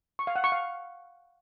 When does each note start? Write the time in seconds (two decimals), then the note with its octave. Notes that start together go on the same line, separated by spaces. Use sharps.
0.19 C#6
0.27 F5
0.36 F#5
0.44 C#6
0.52 F5